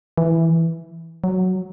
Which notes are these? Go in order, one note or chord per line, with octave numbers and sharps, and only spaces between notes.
E3
F#3